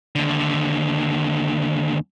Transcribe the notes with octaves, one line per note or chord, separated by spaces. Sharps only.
D#2 D3